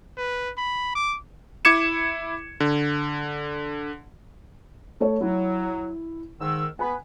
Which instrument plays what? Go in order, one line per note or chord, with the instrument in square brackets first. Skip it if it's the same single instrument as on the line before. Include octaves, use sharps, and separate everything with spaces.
[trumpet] B4
B5
D6
[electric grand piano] E4 D6 G#6 C#7 E7
D3
[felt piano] A3 A4 C#5
[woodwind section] F#3 [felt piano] E4
[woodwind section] G#2 D#3 E6
[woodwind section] B3 B4 [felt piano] G#5 B5